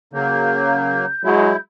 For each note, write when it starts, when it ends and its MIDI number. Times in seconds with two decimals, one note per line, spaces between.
0.13 1.11 49
0.13 1.06 54
0.13 1.06 58
0.13 1.60 91
1.24 1.53 54
1.24 1.53 56
1.24 1.56 64